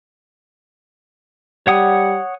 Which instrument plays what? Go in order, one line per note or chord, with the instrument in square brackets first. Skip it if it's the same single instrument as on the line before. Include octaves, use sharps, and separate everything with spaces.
[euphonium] G3 [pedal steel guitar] C#5 F#5 D#6